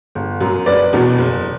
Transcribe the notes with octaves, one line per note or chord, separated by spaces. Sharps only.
G1
F#2 F#3
F#1 B4 D5
E2 B2 F#3
F#1